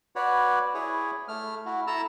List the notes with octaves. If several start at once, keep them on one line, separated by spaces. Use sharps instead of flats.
F#4 B4 C#5 D5
E4 G#4 C#5
A3 F6
E4 F#4
E4 A4 A5 A#5 E6